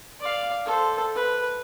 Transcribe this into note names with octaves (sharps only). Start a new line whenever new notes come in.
D5 F5
A4 C5
B4